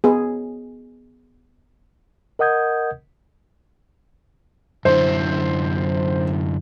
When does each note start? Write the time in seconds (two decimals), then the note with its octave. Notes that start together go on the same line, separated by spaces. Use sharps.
0.04 B3 G#4
2.39 A#4 D#5 F#5 D#6 G6 G#6
4.85 F#2 D3 E4 C5